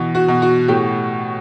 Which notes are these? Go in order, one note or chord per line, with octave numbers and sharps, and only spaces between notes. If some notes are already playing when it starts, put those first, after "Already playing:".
Already playing: B2 E3
F#4
B2
F#4
A2 G4